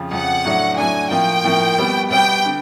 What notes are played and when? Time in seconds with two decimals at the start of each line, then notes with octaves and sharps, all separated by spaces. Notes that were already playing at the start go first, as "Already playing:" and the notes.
Already playing: F2 C#3 F3
0.11 F2 C#3 F3 F#5
0.45 A2 F#3 A3 D4
0.78 A2 F#3 A3 D4 G#5
1.10 A2 F3 A#3 G5
1.44 A2 F3 A#3
1.77 B2 G3 B3
2.10 B2 G3 B3 G5
2.46 D3